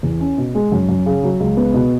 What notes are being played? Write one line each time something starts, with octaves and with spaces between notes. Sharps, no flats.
E2
C#4
B2
G#3
F#2
F#2
C#3
F#3
C#2
B3
B2